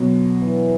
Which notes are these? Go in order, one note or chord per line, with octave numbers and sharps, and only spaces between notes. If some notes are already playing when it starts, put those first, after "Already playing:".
Already playing: B2 D3 F#3
E3